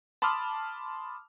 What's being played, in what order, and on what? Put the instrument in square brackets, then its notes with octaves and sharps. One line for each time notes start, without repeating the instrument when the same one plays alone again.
[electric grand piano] A5 B5 C6 D6 D#6 F6